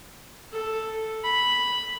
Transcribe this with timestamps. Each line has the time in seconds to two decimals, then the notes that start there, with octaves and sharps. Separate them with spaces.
0.52 A4
1.24 B5